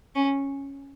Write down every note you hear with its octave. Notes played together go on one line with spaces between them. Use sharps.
C#4